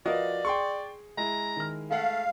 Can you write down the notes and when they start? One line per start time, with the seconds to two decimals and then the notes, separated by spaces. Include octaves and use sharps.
0.05 F3 F#4 A#4 B4 D5 D#5 F5
0.45 G#4 G5 C6 C#6
1.17 G#3 E4 A#5
1.56 D#3 F6
1.91 A3 A4 F5 F#5